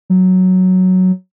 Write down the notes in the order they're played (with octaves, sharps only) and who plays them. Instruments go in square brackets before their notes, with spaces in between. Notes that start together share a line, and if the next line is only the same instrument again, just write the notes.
[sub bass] F#3